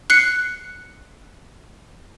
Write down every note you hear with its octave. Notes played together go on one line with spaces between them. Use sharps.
F#6 C7 C#7